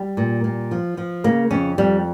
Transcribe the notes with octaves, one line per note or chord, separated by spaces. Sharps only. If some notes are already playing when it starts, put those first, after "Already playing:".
Already playing: G3
A#2
A#2
F3
F3
C#3 A#3
F2 C#4
F2 G3